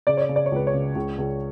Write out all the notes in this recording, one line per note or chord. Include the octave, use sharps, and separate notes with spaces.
C#3 D5
C#5
D5
C#3
D5
C#5
C#2 B4
C#5
C#3
C#2
C#2